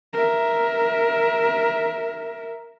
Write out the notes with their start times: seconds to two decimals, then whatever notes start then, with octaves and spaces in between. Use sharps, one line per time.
0.14 A#4 E5